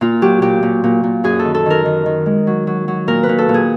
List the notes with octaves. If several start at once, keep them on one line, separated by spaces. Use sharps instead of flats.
A#2 F4
F#3 G4
A#2 G4
A#2
A#2
A#2
F#2 G#4
A4
D#3
A4
D#3 A#4
D#3
D#3
G#3
F#3
F#3
F#3
A#2 A#4
B4
A#2
A4
A#2
G#4